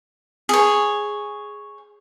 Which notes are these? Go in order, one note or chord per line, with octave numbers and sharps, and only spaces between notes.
G#4 C#5